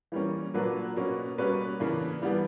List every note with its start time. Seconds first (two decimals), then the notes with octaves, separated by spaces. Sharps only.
0.12 E3 G3 A#3 C#4
0.54 A#2 F#3 A#3 D4 B4
0.96 B2 A#3 C#4
1.38 B2 G3 A#3 C#4 B4
1.80 C#3 E3 A#3 D4
2.22 E3 G3 B3 D4